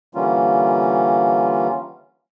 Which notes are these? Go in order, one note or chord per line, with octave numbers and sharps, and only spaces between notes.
D3 E3 G3 A#3 C#4 F4